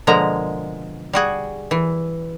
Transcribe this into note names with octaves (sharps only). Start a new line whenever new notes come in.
B2 D3 F3 G#3 A#3 A#5
G3 F#4 G#4
E3